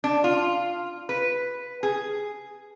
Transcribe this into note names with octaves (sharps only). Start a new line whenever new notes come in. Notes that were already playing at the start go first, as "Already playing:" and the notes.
D4
F4
B4
G#4